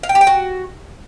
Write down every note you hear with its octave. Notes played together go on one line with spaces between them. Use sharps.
F5
G5
G4
G5
F#4